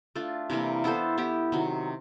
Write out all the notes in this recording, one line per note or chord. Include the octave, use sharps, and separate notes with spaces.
A3 D4 F4
C3 E3 G3 A#3
B3 E4 A4 C5
B3 E4 G4
C3 D#3 F#3